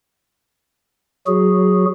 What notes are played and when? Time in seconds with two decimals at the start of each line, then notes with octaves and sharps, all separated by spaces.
1.27 F#3 F#4 G#4